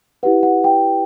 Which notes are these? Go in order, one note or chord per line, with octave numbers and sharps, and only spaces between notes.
E4 G4 B4 F#5
F#5
G5